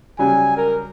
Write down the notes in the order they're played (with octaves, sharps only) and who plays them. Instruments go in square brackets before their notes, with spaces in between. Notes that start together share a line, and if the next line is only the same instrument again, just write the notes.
[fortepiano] C#3 F#3 G3 [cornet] G#5
[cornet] A#4